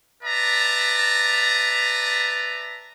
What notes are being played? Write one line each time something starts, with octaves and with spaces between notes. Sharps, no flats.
B4 D5 E5 A5 A#5